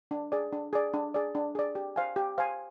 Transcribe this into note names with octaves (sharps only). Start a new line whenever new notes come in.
D4
G#4 D5
D4
G#4 D5
D4
G#4 D5
D4
G#4 D5
G4
C5 F5 G#5
G4
C5 F5 G#5